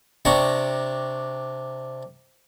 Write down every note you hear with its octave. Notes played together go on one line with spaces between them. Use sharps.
C3 D4 G5 A#5 C#6